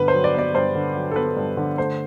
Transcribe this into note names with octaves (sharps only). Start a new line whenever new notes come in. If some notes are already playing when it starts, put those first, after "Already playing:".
Already playing: G2 D3 B3 B4
C5
F#3
D5
B3 D5
G2 C5
D3
F#3
A4
B3 B4
G2
D3
A3 C5